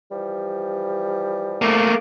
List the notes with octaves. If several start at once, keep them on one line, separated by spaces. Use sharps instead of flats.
E3 F3 G3
A3 A#3